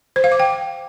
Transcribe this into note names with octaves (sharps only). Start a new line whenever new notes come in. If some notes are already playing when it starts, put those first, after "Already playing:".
C5
F5
D6
G5